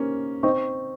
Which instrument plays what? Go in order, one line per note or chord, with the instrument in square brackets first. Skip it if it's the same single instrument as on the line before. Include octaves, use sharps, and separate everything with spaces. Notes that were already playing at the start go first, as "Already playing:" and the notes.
Already playing: [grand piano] A#3 C#4 [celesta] D#4 G4 C5
[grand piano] C4 D#4 [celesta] C5 G5 C#6